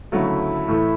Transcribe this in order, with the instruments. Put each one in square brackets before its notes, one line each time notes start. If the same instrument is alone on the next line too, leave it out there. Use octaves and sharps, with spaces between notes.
[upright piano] D2 C#3 F#3 A3 [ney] E4 G4
[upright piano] A2 E3 A3